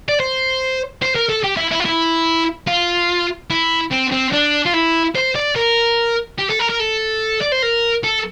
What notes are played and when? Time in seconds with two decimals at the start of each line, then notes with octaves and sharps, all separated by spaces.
0.09 D5
0.20 C5
1.03 C5
1.16 A#4
1.29 A4
1.44 G4
1.57 E4
1.71 E4
1.80 F4
1.85 E4
2.67 F4
3.50 E4
3.91 C4
4.12 C4
4.32 D4
4.66 F4
4.74 E4
5.15 C5
5.35 D5
5.56 A#4
6.38 G4
6.50 A4
6.59 A#4
6.70 A#4
6.79 A4
7.41 D5
7.52 C5
7.62 A#4
8.04 A4